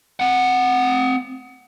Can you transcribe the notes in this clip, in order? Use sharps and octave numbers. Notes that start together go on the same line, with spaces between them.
C4 F#5